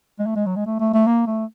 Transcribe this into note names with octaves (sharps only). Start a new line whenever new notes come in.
G#3
A3
G#3
F#3
G#3
A3
A3
A3
A#3
A3